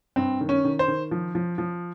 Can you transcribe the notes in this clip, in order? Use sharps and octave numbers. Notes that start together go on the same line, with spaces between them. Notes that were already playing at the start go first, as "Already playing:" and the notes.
G2 C4
D#3
C#4
D#3
C5
D#3
F3
F3
F3